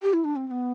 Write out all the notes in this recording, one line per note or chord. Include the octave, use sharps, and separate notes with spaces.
G4
E4
D4
C4
C4
B3